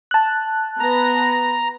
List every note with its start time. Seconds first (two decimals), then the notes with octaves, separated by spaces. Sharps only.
0.11 A5 F#6
0.80 B3 A#5 A#6